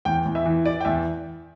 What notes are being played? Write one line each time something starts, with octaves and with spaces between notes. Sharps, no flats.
E2 G5
E2
E5
E3
E3 D5
G5
E2 E5